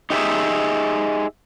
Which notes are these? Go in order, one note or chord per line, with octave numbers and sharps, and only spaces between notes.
D#4 G4 G#4 D5 E5